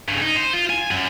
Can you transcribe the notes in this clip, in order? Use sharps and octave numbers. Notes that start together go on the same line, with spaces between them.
G2 C#3
D#4
C5
F4
G#5
F#2